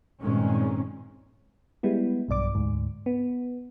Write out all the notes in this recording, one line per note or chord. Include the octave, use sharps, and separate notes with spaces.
G2 A#2 D#3 G#3 C4 C#4
G3 G#3 B3 E4
B1 G2 D5 D6
D2 G#2
B3